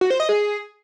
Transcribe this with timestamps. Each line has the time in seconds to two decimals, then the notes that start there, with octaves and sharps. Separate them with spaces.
0.01 F#4
0.10 C5
0.20 D#5
0.29 G#4